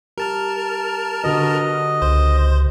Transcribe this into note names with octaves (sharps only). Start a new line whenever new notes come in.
G4 A#4 A5 F6
D3 F#4 B4 D#5
C#2 C5